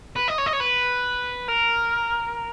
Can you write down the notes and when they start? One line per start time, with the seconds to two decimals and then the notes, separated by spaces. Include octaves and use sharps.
0.16 B4
0.28 D#5
0.38 C#5
0.46 D#5
0.53 C#5
0.60 B4
1.48 A#4